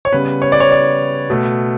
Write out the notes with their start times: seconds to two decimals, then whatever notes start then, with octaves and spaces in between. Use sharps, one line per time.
0.05 C#5
0.12 C#3 G3 B3 B4
0.42 C#5
0.52 D5
0.60 C#5
0.71 D5
1.30 B2 A3